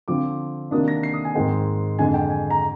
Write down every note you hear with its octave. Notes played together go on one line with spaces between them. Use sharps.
D3 F3 C4 D6
C3 D#3 A#3 D4 D#6
A#6
C7
D#6
G#5
G#2 D#3 G#3 C4 G5
F2 D3 G#3 G#5
G5
G#5
A#5